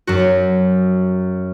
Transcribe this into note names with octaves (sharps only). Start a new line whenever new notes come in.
F#2 F#3 F#4